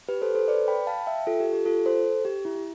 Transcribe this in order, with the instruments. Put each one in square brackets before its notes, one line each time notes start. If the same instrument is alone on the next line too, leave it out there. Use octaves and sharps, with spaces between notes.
[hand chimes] G4 B4
A4 C5
A4 C5
B4 D5
G5 B5
F5 A5
E5 G5
F4 A4
G4
G4
F4 A4
A4 C5
G4
E4
E4